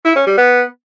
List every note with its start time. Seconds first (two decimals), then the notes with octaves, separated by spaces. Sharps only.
0.05 E4
0.16 C#4
0.27 G3
0.37 B3